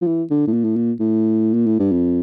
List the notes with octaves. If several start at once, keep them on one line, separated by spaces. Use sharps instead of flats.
F3
E3
D3
A2
A#2
A2
A#2
A2
A#2
A2
G2
F2